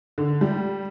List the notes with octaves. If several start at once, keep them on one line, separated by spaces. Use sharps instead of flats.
D3
G3